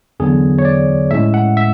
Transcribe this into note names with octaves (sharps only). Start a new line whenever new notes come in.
E2 D3 F#3 B3 G#4
C#5
D5
A2 G#3 C#4 E5
F#5
E5